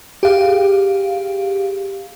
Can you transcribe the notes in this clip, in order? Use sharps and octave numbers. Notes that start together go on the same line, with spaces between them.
G4 G#4 F5